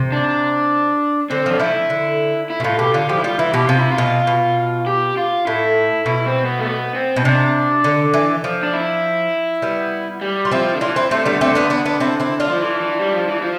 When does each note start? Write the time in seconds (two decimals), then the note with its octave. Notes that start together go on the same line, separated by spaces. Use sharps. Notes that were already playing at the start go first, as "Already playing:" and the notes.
Already playing: C3
0.12 D4
1.30 D3 C4
1.46 F3 D4
1.59 F3 A3 E4
1.90 D3
2.50 E4
2.60 B2
2.64 A2 F4
2.79 B2 G4
2.93 D3 F4
3.09 F3 G4
3.19 E4
3.24 G3 F4
3.39 E3 E4
3.53 B2 G4
3.67 C3 F4
3.80 E4
3.92 F4
3.98 B2
4.27 B2
4.87 G4
5.17 F4
5.47 A2 E4
6.06 B2 E4
6.26 C4
6.45 B3
6.59 A3
6.66 B3
6.95 C4
7.16 B2 C4
7.24 C3 D4
7.84 D3
8.14 E3
8.44 F3
8.63 D4
8.73 E4
9.62 G3 B3
10.21 G3
10.45 F4
10.51 F3 C4 E4
10.74 D3
10.81 E3 D4 F4
10.96 C4 E4
11.11 C3 A3 C4
11.25 D3 G3 B3
11.41 A3 C4
11.55 B3 D4
11.70 B3 D4
11.85 B3 D4
12.00 C4 E4
12.20 C4 E4
12.40 D4 F4
12.49 F3
12.60 E3
12.80 E3
12.99 G3
13.13 F3
13.27 E3
13.42 F3